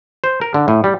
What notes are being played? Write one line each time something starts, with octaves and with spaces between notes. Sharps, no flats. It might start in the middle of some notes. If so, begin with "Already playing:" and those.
C5
A#4
D3
A2
G3